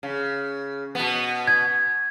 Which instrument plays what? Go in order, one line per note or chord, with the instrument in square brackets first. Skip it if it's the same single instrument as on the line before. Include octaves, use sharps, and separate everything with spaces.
[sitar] C#3
B2 B3
[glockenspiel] G#6